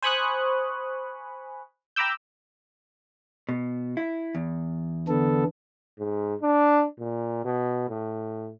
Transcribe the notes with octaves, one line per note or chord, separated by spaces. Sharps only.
C5 G#5 B5 C#6 D#6 F#6
G5 A#5 B5 D6 E6 G6
B2
E4
E2
D3 B3 A4
G#2
D4
A#2
B2
A2